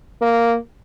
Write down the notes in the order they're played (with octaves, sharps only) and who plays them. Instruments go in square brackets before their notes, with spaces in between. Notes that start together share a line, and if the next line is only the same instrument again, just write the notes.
[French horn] A#3